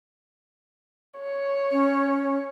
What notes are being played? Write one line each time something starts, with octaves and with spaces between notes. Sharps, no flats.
C#5
C#4